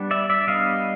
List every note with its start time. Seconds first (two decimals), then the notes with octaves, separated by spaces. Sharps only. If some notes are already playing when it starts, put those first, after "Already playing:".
Already playing: G3 B3 D4
0.11 D5 E5
0.30 D5 E5
0.47 G3 B3 D4 D#5 F5